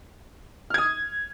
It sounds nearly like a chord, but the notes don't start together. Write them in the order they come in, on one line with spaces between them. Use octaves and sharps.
F6 G#6 D#6